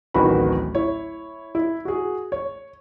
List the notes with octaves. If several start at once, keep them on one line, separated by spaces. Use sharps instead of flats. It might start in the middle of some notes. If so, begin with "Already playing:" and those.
D1 A1 D#3 E3 F#4 B5
E4 C#5
E4
F#4 G#4
C#5